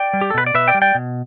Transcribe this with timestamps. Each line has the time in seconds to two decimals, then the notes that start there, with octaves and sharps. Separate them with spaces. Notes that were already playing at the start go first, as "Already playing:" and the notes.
Already playing: D5 G5
0.13 G3
0.21 G4
0.30 A4
0.34 B2 B4
0.46 D5
0.54 B2 B4 E5
0.68 D5 G5
0.74 G3
0.82 D5 G5
0.95 B2